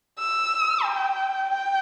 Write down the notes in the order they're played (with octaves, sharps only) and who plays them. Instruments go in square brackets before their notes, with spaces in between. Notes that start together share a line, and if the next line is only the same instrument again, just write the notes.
[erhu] E6
G5
G5